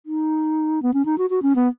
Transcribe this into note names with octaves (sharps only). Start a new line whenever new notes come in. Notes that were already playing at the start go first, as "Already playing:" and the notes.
D#4
B3
C#4
D#4
F#4
F#4
C#4
B3